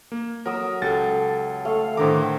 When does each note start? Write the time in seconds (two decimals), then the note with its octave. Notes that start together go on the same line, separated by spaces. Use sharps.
0.12 A#3
0.46 F#3 A#4 D#6 E6
0.82 C#2 G4 A4 A6
1.65 A3 F5
1.97 A2 D3 D#3 C5 G5 A#5 D6